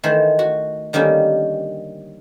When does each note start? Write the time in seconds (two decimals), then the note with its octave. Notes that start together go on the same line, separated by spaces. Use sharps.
0.04 D#3 E3 A3 C5
0.39 F#4
0.93 D3 D#3 G3 A#3 C#4